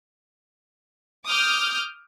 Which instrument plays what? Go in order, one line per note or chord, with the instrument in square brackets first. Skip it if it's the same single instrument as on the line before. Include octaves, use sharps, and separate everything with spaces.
[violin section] D6 D#6 F6 G6